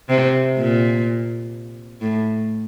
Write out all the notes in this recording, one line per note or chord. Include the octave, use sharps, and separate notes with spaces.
C3
A#2
A2